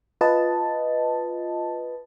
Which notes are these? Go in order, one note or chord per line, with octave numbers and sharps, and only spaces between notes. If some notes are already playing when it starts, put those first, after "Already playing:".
F4 B4 D#5 A5